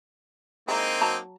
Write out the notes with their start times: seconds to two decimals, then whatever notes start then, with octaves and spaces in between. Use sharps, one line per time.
0.68 G#3 A#3 C4 D#4 E4
1.01 F#3 A5 A#5